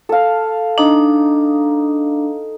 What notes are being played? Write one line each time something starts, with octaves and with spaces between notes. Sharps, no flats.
A4 F5
D4 D#4